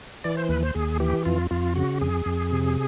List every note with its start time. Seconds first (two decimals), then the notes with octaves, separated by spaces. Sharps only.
0.24 E3 D5
0.37 C5
0.49 D#2 B4
0.63 C5
0.75 D#2 G#4
1.00 E3 G4
1.25 F2 F4
1.51 F2 F4
1.76 C#3 F#4
2.01 F2 G#4
2.26 F2
2.52 C3